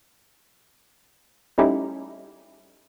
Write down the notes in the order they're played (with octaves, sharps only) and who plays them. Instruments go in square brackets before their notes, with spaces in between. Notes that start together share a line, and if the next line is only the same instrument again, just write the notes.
[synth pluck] G3 A3 C#4 D#4 E4 G4